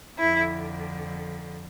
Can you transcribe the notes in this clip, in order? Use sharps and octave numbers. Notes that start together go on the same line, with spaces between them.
F2 D3 E4